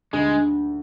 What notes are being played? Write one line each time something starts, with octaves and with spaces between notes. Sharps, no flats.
D2 G#3
D3